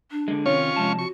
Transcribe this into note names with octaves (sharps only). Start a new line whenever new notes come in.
D4
D3 G#3
C3 D#3 C#4 F4 C#5 C#6
C3 F3 G#3 A5
F#4 C#6